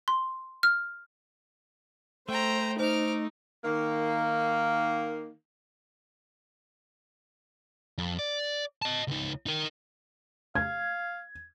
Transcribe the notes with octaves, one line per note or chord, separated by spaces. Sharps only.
C6
F6
A3 C5 G5 A#5
D#4 C5 D6 F6
D#3 A#3
F2
D5
D#5 A5
C#2 D#4
D#4 A#4
F5 G#6